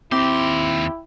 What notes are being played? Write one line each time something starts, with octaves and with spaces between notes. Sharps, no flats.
D#2 C4 E4 G4 C6